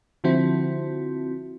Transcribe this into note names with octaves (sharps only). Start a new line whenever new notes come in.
D3 F3 C4 E4 F#4